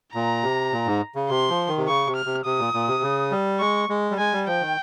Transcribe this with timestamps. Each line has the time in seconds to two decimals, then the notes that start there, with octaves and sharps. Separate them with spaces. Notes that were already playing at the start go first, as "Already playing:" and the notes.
0.14 A#2 A#5
0.43 C3
0.72 A#2
0.86 G#2
1.15 C#3
1.29 C3 C6
1.49 F3
1.68 D#3
1.78 C3
1.88 C#3 C#6
2.07 C3
2.16 F6
2.26 C3
2.45 C3 D#6
2.59 A#2
2.74 A#2
2.88 C3
3.03 C#3
3.31 G3
3.60 G#3 C#6
3.89 G#3
4.11 G3
4.18 G#3 G#5
4.33 G3
4.47 F3 G5
4.61 D#3